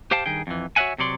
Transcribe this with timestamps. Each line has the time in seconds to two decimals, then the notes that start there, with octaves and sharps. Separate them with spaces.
0.11 G4 C5 F5 G5 A5
0.26 G2 D#3 G#4 G5
0.47 F2 E3
0.76 F#4 C#5 D#5 E5 F#5 G#5
0.98 C3 F#3 C#5 D5 C6